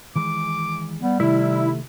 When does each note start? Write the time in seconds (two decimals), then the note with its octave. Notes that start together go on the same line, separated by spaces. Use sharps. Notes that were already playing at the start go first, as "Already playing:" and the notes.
0.15 D#3 E3 G#3 D6
1.02 G3 B3
1.20 C3 D#3 A3 E4